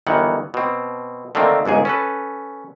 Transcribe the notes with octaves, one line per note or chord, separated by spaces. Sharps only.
G1 D#3 E3 F#5
B2 C4
D3 D#3 A3 A#3 C4
G1 C#2 G#2 G#4
C#4 A4 B4